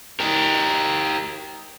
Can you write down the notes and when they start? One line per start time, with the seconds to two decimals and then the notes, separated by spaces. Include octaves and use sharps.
0.20 G4 A#4